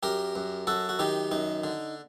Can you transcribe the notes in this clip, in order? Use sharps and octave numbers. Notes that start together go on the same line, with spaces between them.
F#2 G4 A#4
F#2
F#2 F#4 A4
F#4
D#3 D#4 G4
F#2 D#4
D3